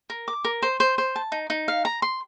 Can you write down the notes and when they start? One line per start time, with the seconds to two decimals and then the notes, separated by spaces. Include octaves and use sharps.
0.10 A#4
0.28 D6
0.45 A#4
0.62 C5
0.80 C5
0.98 C5
1.16 A5
1.32 D#4
1.50 D#4
1.68 F5
1.85 A#5
2.02 C6